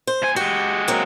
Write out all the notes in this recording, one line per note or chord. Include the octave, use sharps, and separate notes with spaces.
C5
B2 G#5
G#3 F#4 G4
F#3 A#3 C4